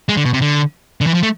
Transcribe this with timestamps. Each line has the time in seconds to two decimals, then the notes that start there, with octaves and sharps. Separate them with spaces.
0.09 G#3
0.17 D3
0.25 B2
0.33 C3
0.41 D3
1.01 D3
1.07 E3
1.14 F3
1.23 A3